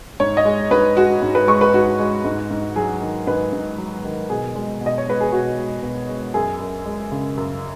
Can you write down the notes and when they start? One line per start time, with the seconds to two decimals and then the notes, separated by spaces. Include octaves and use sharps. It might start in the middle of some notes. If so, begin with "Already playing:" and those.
0.20 G#2 C#5
0.37 D#5
0.45 G#3
0.71 G#2 B4
0.97 G#3 F#4
1.22 G#2
1.35 B4
1.47 G#3 C#6
1.61 B4
1.73 G#2 F#4
1.99 G#3
2.25 G#2
2.51 G#2
2.76 F#3 G#4
3.01 D#3
3.27 G#2 B4
3.53 G#2
3.78 F#3
4.04 D#3
4.29 B2 G#4
4.55 G#3
4.81 B2
4.86 D#5
4.98 C#5
5.07 G#3 B4
5.20 G#4
5.32 B2 F#4
5.57 G#3
5.83 B2
6.09 G#3
6.34 F#2 G#4
6.60 F#2
6.86 G#3
7.12 C#3
7.37 F#2